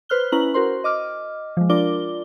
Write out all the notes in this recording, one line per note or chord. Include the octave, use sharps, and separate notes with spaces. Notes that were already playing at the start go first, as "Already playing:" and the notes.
B4 C5 F6 F#6 G7
C#4 E4 B4 A#5 F#7
F#4 A#4 C5 C6
D#5 D6 F6
F3 G#3
D4 F4 A#4 D5 D6 G7